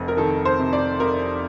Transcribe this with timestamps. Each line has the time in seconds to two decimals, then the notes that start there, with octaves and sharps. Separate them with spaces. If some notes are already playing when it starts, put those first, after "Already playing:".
Already playing: F1 F2
0.08 A#4
0.17 D#3 A4
0.45 C5
0.59 C3
0.73 D5
1.00 F2 A#4